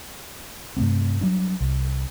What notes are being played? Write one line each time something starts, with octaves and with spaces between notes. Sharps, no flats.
G2 C3 A3 C4
F#3 G3 D4
C2